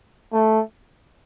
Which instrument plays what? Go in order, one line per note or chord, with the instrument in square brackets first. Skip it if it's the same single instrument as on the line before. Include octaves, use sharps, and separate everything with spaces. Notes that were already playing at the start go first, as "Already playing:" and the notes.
[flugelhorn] A3